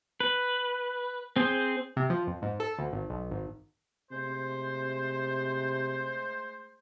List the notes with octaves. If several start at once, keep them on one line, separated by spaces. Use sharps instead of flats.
B4
C4 G#4 C5
C3
F3
F2
G#2
A4
D2
G#1
B1
G#1
C3 G#3 A3 C5